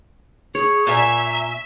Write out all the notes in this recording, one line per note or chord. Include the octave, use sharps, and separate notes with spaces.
G#4 C#5
A#2 E5 G#5 A#5